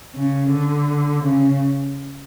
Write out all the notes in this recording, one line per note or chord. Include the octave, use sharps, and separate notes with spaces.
C#3
D3
C#3